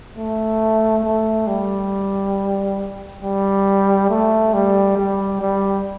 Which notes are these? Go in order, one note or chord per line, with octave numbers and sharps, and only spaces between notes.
A3
A3
G3
G3
A3
G3
G3
G3